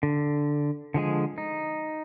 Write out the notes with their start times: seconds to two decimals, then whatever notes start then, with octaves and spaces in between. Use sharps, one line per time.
0.03 D3
0.94 D3 F3 G#3 G#4
1.38 D#4